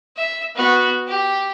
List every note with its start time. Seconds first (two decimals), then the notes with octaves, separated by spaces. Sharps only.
0.16 E5
0.55 B3 F#4
1.08 G4